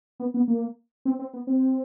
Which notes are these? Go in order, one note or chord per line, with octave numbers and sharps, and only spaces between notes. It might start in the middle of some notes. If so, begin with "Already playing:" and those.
B3
B3
A#3
C4
C4
B3
C4